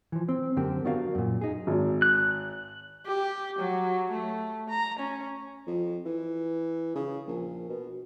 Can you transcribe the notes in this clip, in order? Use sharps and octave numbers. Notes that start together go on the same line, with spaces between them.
E3 F3
C4
F#2 D3 A#3 C4 G4
B3 D4 F#4 A#4 D5 F5
F#2 A#2
D#4 G#4
G#1
F#6
G4
F#3
A3
A#5
C#4
F2
E3
C#3
A#1
B2